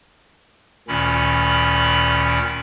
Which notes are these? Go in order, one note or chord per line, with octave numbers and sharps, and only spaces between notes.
D2 A#2 D#3 C#4 B5